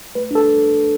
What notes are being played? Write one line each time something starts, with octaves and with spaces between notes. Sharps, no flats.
A3 B4
D4 A4